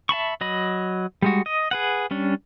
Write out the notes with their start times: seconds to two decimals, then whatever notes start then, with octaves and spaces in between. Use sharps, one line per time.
0.09 E5 A5 B5 C#6
0.41 F#3 D#5 B5
1.22 G3 G#3 F#4
1.46 D#5
1.71 G#4 B4 F#5
2.11 G3 C#4 D4